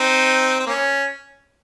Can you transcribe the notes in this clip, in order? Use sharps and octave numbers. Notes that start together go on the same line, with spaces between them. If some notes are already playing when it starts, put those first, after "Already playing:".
Already playing: C4 D#4
C4
A#3 C#4